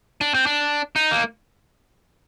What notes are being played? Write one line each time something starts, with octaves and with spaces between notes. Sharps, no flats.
D4
C4
D4
D#4
A#3